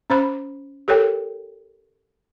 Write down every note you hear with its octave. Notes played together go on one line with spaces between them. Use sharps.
C#4 C5 B5
G4 A4 A#4 C#5 G5